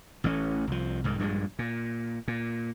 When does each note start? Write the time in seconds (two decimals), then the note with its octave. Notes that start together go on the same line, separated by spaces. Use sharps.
0.24 A1 E3 A3 C#4
0.67 C2 F3
1.04 C2 G#2 D#3
1.18 A#1 G2 A#2 G#3
1.59 A#2
2.28 A#2